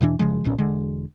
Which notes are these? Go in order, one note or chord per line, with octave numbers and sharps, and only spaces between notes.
E2 B2 E3 D4
F#1 C#3 F3 G#3
D#1 B1 A#2 C#4
E1 D3 G#3